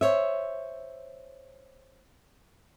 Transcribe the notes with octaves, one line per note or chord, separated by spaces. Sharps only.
C5 C#5 E5